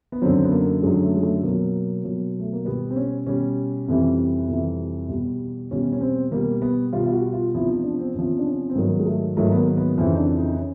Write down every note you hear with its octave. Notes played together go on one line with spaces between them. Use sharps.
B3
F#2 D3 F#3 C4
B3
A#3
F#2 D3 F#3 G#3
A3
G#3
A3
B2 F#3 A#3
B2 F#3
A3
A#3
B2 G3 B3
C4
C#4
B2 G3 C#4
F2 C3 E3 G3
F2 C3 E3 G3
E2 B2 G3
E2 B2 G3 C#4
C#4
C4
B2 G3 A#3
B3
B2 G3 F4
F4
F#4
F4
E2 C3 F3 E4
D#4
D4
C4
E2 C3 F3 C#4
D4
C#4
C4
G#2 D#3 F#3 B3
G#3
A3
G#2 D#3 F#3 A3
B3
A#3
A#3
B3
F2 C#3 E3 C4
D#4
D4
D#4
C#4